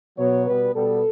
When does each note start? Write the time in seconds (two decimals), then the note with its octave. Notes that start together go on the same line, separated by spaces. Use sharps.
0.18 B2 F#3 B3 C#5
0.46 B2 G3 B3 B4
0.74 B2 G3 B3 A4